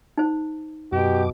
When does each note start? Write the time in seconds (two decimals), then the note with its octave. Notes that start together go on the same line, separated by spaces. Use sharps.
0.18 D#4 C5
0.92 F#2 B2 G4 D6